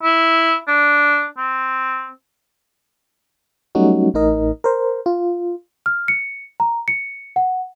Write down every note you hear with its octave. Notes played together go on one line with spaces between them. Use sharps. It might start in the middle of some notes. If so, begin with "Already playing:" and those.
E4
D4
C4
F#3 G3 A3 C#4 D#4 F#4
A1 A2 D#4 A#4 D#5
A#4 C5
F4
F6
C#7
A#5
C#7
F#5